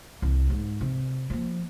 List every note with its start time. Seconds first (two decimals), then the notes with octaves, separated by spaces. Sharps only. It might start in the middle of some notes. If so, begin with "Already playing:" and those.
0.22 C2
0.50 G#2
0.81 C3
1.30 F3 A#3